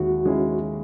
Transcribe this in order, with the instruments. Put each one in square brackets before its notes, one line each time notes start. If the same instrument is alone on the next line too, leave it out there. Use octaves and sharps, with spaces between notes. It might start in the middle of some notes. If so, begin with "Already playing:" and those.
Already playing: [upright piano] D#2 D#3 G#3 E4 [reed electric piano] F#4
[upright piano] D#3 G#3 C#4 E4